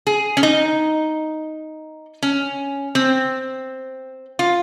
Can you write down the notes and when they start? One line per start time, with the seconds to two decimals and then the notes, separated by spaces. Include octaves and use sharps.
0.07 G#4
0.37 C#4
0.43 D#4
2.23 C#4
2.95 C4
4.39 F4